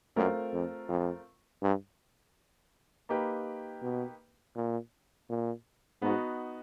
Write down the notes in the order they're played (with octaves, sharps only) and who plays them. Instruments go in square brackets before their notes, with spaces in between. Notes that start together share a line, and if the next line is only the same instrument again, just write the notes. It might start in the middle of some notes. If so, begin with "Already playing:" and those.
[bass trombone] F#2 [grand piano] A3 C4 F4 A#4
[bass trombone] F2
F2
G2
[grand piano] A#3 D#4 G4 B4
[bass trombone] B2
A#2
A#2
[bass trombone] G#2 [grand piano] B3 D#4 F#4